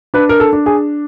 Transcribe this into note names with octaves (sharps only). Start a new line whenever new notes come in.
D4 B4
A#4
A4
D4
G#4